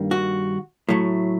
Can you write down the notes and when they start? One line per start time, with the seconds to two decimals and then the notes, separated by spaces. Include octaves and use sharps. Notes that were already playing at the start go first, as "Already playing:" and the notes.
Already playing: G2 D#3 G3 A#3
0.11 F#4
0.89 A2 F#3 A3